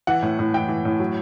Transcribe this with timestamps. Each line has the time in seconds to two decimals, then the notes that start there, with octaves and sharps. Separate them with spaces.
0.07 E3 F#5
0.23 A2
0.39 A2
0.54 E3 G5
0.69 E3
0.85 A2
1.00 F#3